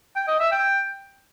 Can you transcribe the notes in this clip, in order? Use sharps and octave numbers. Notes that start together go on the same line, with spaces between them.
G5
D#5
E5
G5